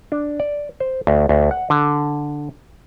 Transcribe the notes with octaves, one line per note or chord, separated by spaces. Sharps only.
D4
D5
C5
D2
D2
F#5
D3